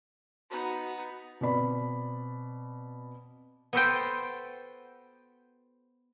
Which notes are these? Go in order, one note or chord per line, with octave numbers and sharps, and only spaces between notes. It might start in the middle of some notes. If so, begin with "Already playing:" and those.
B3 D#4 F#4 F#5
B2 C4 D5 B5
B3 F#4 A4 B4 C5 G5